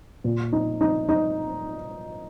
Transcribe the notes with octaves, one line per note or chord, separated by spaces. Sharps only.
A#2
D#4
D#4
D#4